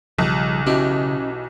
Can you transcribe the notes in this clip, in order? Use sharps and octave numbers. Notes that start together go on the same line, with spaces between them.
B1 C#3 F3 G3
B2 E3 C#4 G4